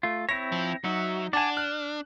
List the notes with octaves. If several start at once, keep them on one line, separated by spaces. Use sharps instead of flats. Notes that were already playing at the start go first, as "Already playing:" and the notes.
A3 F4
C4 E4 C#5 A#6
F3
F#3 D#4 F#4 E5
D4 D5 F#5 G#5 A5 E7
F6 F#6